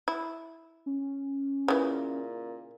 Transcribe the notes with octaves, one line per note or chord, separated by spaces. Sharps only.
E4
C#4
A#2 C#3 E3